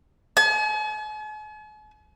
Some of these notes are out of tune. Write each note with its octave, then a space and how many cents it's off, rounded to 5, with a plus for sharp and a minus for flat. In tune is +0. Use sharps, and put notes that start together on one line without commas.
G#5 +45